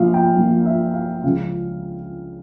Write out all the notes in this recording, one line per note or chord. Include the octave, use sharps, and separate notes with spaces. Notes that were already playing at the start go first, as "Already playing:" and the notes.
Already playing: A#1 A#2 F3 F5
G5
A#1 A#2 F3
E5
F5
C#2 C#3 F3 F5